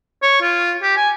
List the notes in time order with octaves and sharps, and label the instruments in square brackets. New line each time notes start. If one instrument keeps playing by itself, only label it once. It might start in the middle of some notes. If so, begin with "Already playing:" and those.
[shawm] C#5
F4
G4
G#5